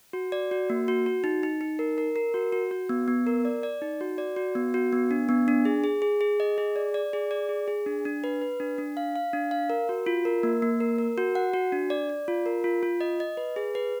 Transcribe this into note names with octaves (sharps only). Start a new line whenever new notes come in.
F#4
D5
F#4
A#3
F#4
F#4
D#4
D#4
D#4
A#4
A#4
A#4
F#4
F#4
F#4
B3
B3
A#4
D5
D5
D#4
F#4
D5
F#4
B3
F#4
B3
D4
B3
D4
G#4
G#4
G#4
G#4
D#5
G#4
D5
D5
G#4
D5
G#4
G#4
D4
D4
B4
B4
D4
D4
F5
F5
D4
F5
A#4
F#4
F4
A#4
A#3
A#3
A#4
A#4
F#4
F#5
F#4
D4
D5
D5
F4
A#4
F4
F4
D#5
D#5
B4
G#4
B4